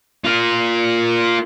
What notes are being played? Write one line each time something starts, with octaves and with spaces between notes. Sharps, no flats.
F4 A#4